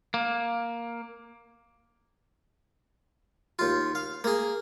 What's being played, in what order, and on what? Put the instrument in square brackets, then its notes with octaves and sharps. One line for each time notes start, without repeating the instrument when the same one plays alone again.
[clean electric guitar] A#3
[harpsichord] D#2 F4
F5
A#3 G#4